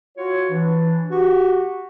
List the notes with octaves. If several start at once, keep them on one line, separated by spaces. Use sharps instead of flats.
F4 F#4 C#5
E3 D4
F#4 G4